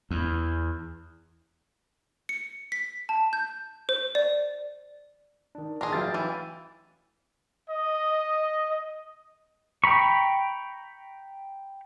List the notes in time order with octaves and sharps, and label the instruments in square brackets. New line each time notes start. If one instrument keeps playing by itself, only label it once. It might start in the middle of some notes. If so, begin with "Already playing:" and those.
[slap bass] E2
[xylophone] C#7
B6
A5
G6
C5
D5
[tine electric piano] D#3 D4
[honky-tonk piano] A#2 [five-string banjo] D4 G#4 [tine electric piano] A#5 C6
[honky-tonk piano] A1 F#3 A6 [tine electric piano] E5 F5 G5
[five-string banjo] E3
[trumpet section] D#5
[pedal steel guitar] G5 A#5 B5 C#6